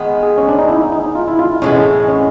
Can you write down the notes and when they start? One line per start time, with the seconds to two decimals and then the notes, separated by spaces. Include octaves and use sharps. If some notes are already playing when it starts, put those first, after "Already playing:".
Already playing: D#3 G#3 B3
0.23 G#4
0.38 C#4
0.48 D4
0.59 D#4
0.69 E4
0.92 D#4
1.15 F4
1.28 E4
1.39 F4
1.62 A2 E3 G#3 B3 C#4
2.09 C#4